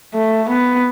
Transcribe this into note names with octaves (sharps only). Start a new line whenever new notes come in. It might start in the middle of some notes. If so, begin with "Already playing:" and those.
A3
B3